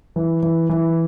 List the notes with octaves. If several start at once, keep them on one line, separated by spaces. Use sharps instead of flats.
E3
E3
E3